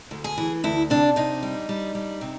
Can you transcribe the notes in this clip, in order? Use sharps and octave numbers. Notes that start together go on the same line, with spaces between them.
D2
G#4
E3
D2 E4
C3 D4
C3 D#4
G3
G3
G3
C3